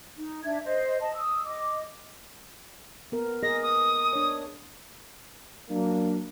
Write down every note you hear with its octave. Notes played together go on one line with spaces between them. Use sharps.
D#4
D4 E5 G#6
C5 D#5
D#5 A5
D#6 E6
D#5 D6
B3 A#4
G#4 A#4 D#5 A#6
D#6
D4 C#5
F#3 A#3 D4